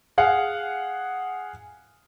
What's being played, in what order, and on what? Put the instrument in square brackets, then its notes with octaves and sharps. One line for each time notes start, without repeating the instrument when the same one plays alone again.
[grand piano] G#4 F5 F#5